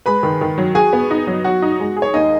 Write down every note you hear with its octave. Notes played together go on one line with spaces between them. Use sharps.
G#3 B4 B5
D#3
D#3
F#3
F#4 G#4 G#5
B3
D#4
F#3
F#3 F#4 F#5
D#4
G#3
G#4
C#5
D#2 D#4 D#5